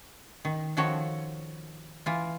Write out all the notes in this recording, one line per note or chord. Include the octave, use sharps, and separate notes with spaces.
D#3
D#3 F3 F#4 A4 C#5
E3 F4